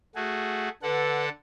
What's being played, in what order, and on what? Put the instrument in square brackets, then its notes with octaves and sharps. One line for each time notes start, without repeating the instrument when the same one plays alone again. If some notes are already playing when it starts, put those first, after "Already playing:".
[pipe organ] A3 F#4 G#4
[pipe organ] D3 A4 F#5 [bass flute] B4